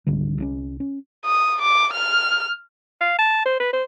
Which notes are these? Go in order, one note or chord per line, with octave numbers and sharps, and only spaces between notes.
G#1 C#2 D3 G3
C2 F3 C#4
C#4
D#6
D6
F6
F5
A5
C5
B4
C5